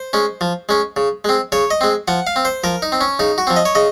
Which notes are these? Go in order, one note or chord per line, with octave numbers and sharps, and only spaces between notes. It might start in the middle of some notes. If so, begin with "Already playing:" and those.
Already playing: C5
G#3 C#4
F3
G#3 C#4
C#3
G#3 C4
C#3 C#5
D#5
G#3 C4
F3 F#5
F5
C4
C5
F3 A#4
D#4
C4
C#4
C#3 D#4
F#4
F3 C4
D#5
C#5
C#3 D#5